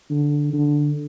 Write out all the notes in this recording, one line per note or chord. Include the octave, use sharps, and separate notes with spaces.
D3
D3